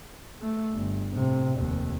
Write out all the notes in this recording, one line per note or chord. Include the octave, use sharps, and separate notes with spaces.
A3
G1
A2 C3
F1 D#2